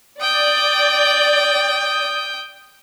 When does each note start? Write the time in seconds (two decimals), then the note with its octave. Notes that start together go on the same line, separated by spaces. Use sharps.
0.21 D5 G5 D#6